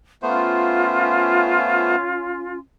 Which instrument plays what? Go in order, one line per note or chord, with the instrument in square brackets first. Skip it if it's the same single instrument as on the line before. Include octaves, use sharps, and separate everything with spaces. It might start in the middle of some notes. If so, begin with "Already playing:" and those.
[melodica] A3 B3 C5 [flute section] C#4 F4